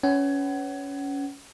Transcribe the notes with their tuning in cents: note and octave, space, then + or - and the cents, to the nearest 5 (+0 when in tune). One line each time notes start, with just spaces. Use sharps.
C#4 +15 B4 +35 F#5 +35